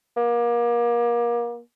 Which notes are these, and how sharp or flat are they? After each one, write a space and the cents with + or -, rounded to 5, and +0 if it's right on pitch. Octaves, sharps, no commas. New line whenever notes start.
A#3 +30